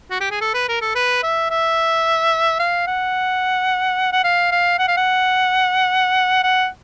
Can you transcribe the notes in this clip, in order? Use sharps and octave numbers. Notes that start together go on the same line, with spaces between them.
F#4
G4
G#4
A4
B4
A#4
A4
B4
E5
E5
F5
F#5
F#5
F5
F5
F#5
F5
F#5
F#5